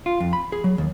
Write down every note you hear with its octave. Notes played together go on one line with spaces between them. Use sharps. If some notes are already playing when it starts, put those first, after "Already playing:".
F4
F2
B5
G#4
F#3
D#2